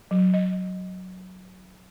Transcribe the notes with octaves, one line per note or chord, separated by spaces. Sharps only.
F#3
D#5